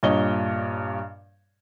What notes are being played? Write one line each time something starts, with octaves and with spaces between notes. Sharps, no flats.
G2 A#2 C#5 D#5 G7